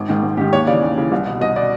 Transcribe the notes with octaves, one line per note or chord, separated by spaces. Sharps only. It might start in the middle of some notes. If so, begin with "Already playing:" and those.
Already playing: G#1
G#2 D#3
G#1
G#2 D#3 G4
D#2 C#5
C#3 E3 D5
D#2
C#3 E3
C2
B2
C2 D#5
B2 D5